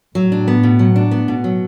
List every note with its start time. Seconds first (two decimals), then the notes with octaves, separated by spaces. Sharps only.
0.15 A2 F#3
0.32 D4
0.48 B3
0.63 B2
0.79 F#3
0.96 D4
1.11 B3
1.28 B2
1.44 F#3